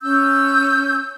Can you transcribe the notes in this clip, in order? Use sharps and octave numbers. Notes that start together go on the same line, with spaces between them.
C#4 E6 G6